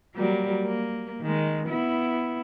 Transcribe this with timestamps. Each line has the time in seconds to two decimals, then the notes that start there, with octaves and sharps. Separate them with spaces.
0.15 F#3 G3 A#3
0.63 A#3
1.21 D#3 G#3
1.68 B3 E4